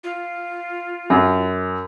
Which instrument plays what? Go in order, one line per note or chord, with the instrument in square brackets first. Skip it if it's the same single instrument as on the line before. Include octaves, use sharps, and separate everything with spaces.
[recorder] F4
[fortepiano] F#2